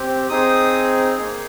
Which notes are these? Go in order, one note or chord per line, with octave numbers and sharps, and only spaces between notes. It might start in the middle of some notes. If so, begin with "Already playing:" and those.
Already playing: C4 G4
C4 D#4 G#4 D#6
A#3 D#4 G#4